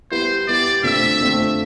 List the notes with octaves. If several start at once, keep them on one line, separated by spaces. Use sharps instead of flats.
G3 B3 E4 G4 C5
G3 B3 E4 G4 D5
D3 A3 C4 F4 E5
D3 A3 C4 F4